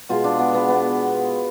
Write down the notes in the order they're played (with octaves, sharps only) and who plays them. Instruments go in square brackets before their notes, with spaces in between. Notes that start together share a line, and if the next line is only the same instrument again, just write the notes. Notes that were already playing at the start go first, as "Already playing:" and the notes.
[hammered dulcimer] B2 G#3 F4
D4
B3
B3
B3